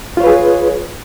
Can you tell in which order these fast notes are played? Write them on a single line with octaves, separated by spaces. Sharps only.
F4 C#5 B4 G#4